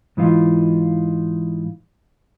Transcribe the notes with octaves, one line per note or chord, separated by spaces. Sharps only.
G#2 E3 D#4 F4